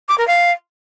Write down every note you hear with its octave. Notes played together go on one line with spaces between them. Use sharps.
D6
A#4
F5